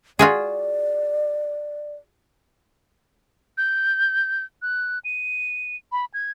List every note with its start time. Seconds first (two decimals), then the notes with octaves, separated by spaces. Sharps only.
0.19 F4 F#4 G#4 D5
3.58 G6
4.62 F#6
5.05 D#7
5.92 B5
6.14 G#6